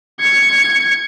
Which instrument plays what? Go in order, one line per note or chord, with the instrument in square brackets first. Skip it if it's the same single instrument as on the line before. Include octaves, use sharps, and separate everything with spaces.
[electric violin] G#6 C#7